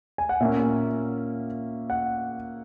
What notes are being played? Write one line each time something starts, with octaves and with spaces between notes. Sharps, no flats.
G#5
F#5
A#2 A#3 C#4 E5
F#5